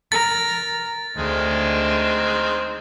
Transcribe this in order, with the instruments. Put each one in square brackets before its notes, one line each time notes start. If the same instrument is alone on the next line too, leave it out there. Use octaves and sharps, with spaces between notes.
[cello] A#4 [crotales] A6
[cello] D2 [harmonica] D#3 G#3 C4